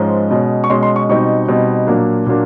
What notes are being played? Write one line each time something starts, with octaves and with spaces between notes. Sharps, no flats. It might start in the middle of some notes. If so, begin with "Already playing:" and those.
Already playing: G#2 F3 G#3 C#4
B2 G#3 C#4
C#6
B2 G#3 C#4 C6
C6
C#6
B2 G3 C4 D#4 C#6
B2 G3 C4 D#4
A#2 F#3 A#3 D4
A#2 F#3 A#3 D4